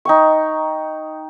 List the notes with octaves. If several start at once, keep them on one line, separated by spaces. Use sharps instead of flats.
D#4 G5 C#6